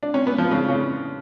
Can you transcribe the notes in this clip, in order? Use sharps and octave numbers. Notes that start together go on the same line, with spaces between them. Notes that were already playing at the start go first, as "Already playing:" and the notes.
D4
C#4
B3
F3
C#3
C#3